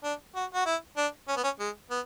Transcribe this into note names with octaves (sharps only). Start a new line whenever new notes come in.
D4
F#4
F#4
E4
D4
C#4
B3
C#4
G#3
B3